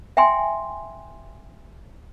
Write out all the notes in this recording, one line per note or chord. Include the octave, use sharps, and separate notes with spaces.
E5 G5 G#5 C6